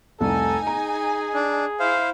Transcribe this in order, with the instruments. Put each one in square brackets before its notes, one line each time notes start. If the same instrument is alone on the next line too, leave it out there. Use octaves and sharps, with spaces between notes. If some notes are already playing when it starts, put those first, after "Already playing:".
[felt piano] F1 C2 [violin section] D#4 G#5 [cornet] A4
[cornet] G#4 [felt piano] A#5
[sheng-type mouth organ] D4
[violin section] E4 [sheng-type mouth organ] C5 F5